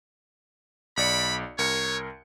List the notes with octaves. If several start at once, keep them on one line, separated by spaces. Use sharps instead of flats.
B1 D5 B5 C#7
C2 A#4 C#5 C#7